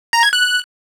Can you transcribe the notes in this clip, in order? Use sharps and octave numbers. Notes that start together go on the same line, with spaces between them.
A#5
G#6
F#6